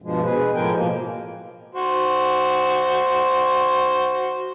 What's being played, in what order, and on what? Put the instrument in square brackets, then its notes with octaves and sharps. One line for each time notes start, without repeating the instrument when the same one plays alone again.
[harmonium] G2 B2 F3 G#3
B2 G#4 B4
A2 F3 G#3 A#4 G5 G#5
B2 F3 A#3
[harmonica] F#4 C5